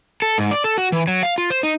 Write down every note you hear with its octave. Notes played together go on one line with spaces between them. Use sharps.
A4
G#2
D5
A4
F#4
E3
F#3
F5
F4
C5
D#4